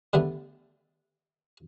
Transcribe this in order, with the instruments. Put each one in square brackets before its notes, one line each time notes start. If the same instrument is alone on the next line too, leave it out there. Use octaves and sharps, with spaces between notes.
[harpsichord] D3 G3 A3 B3